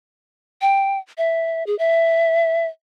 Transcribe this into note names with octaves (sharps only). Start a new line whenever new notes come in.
G5
E5
G#4
E5